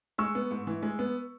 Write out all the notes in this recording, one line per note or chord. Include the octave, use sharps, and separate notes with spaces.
G#3 C#6 E6
B3
G#2
E3
G#3
B3